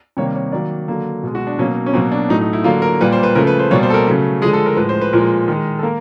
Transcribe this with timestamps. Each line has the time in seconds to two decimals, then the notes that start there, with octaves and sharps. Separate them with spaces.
0.17 C3 D#3 G3 A#3 C#5
0.35 C#5
0.52 D#3 F#3 A#3 D5
0.88 D3 F#3 A#3
1.23 B2 G#3
1.35 F#4
1.47 D4
1.58 B2 F#3 A#3 C#4
1.86 C#4
1.94 B2 F#3 A#3 C4
2.12 D4
2.29 A2 F#3 A3 D#4
2.41 D#4
2.53 E4
2.64 D3 F#3 A#3 F4
2.82 A#4
3.01 A#2 G3 A#3 B4
3.13 C5
3.23 B4
3.35 C#3 F3 A3 A#4
3.47 B4
3.59 C5
3.71 B2 G3 A#3 C#5
3.83 C5
3.90 A4
3.94 A#4
4.07 C#3 F#3 A3
4.42 D3 F3 G#3 G#4
4.53 A4
4.66 A#4
4.77 A2 F3 G#3 B4
4.89 C5
5.01 B4
5.13 A#2 F3 G#3 A#4
5.48 D#3 G#3
5.79 A4
5.83 A#3 A#4